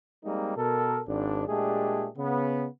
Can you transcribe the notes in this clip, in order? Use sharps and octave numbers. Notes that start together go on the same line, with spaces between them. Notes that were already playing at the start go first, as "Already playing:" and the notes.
G3 G#3 A#3 C4 D#4
B2 A4 A#4
G#1 G#2 D4
A#2 G#3 A3 D4 G4 G#4
C#3 B3